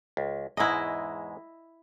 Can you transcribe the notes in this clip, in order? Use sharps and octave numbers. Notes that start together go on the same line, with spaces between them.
C#2
E2 G#2 G#3 E4 D#5